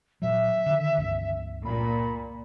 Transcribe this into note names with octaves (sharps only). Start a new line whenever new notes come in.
A#2 F#3 E5
D3 D#3
C#2 G2
A#2 B5